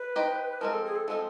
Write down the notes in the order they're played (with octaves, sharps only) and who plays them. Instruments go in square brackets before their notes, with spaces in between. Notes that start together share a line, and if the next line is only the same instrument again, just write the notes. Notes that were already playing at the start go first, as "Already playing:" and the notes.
Already playing: [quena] B4
[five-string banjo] D#4 G4 C5 D#5
[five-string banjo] F3 G#3 C4 [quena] A#4
[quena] A4
G#4
A4
[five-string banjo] F3 G#3 C4 [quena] A4